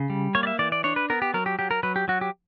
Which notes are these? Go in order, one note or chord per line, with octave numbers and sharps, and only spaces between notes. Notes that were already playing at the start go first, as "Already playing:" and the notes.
Already playing: C#3
G3
A#3 C#5
D5
E5
E3 D5
D5
D4 C#5
B4
B3 A#4
G4
F#3 A#4
G4
F#3 G4
A#4
F#3 B4
G4
F#3 F#4
G4